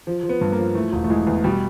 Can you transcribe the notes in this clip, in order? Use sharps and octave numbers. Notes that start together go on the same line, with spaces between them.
F3
F3
B3
G2
A#3
F3
E3 A3
E1
A3
E3 G#3
E2
B2 G3